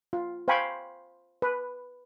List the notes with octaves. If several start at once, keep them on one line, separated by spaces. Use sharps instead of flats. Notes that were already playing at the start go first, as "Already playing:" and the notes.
F4
C5 F5 G5 G#5 B5 C#6
B4